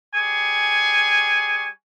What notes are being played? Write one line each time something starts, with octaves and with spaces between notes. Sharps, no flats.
G3 G#4 G#5 C#6